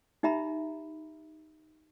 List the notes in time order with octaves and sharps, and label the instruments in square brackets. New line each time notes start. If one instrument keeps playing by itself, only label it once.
[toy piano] D#4 G4 E5 A#5 B5